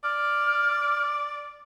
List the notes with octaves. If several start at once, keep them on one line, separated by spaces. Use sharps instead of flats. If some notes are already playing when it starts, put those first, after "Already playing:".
D5 F6